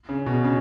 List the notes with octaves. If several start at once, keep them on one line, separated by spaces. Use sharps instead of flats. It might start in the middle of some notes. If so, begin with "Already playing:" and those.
C#3
B2
C#3